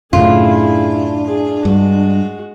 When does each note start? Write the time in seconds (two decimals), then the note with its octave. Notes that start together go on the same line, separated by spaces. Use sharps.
0.13 F#2 A2 C#3 D4 E4 F4 G#4
1.26 G#4
1.65 G2 G#3 F#4